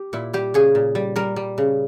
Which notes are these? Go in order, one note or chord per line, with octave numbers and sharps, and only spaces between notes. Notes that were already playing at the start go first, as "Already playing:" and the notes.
Already playing: G4
A#2 E4
G3 G4
C#3 G#4
A#2
G3
G3 A#4
G3
C#3